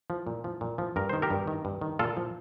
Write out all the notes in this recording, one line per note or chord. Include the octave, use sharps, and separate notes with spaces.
F3
A#2
F3
A#2
F3
G2 A#4
D#3 C5
G4 A#4
G2
D#3
G2
D#3
A#2 F4 A4
F3